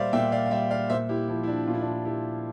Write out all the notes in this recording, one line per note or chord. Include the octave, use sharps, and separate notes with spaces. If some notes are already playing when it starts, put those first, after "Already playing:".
Already playing: A#2 G3 C5 D5 E5 F5
A#2 E5 G5
D5 F5
F5
G3 E5 G5
D5 F5
A#2 C5 E5
E4 G4
F3 E4
E4
D4
A#2 F4
E4
D4
E4
F3 E4 G4